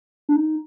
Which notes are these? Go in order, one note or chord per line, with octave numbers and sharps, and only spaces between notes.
D4
D#4